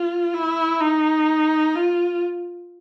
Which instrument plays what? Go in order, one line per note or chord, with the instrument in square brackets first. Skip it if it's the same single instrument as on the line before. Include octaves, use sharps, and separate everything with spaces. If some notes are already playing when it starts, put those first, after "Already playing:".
Already playing: [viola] F4
E4
D#4
F4